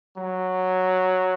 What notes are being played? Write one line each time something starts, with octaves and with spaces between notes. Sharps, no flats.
F#3